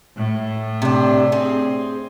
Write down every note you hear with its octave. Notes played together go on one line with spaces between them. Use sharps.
A2
C3 D4
C4 G#4